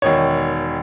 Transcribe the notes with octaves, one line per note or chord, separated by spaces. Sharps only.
E1 D#3 C#5